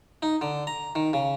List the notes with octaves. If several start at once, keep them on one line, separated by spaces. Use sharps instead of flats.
D#4
D3
A#5
D#3
C#3